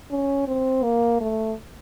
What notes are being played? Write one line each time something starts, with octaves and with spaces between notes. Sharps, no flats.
C#4
C4
A#3
A3